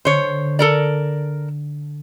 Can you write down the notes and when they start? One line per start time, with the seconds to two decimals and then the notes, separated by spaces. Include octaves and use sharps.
0.05 D3 C5 C#5
0.59 A4 A#4 D5